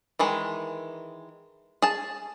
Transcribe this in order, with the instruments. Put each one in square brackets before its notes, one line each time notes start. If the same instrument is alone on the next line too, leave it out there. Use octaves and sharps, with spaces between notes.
[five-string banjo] D#3 E3 G#3
G#4 A5